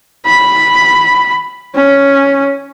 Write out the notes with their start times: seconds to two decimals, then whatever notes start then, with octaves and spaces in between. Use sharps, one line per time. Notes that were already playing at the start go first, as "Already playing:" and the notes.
0.26 B5
1.75 C#4